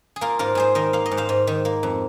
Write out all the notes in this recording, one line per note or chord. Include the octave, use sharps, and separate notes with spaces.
G#4
A#3 F4 A#4
G#2 F4 A#4
G#2 G#4 C5
D#3 A#4 D#5
A#3 F5
D#5
G#2
C5 F5
G#2
D#3
A#3
F2